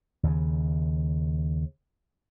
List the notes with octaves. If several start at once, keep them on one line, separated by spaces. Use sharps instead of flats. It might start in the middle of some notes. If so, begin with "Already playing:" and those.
D#2 C#3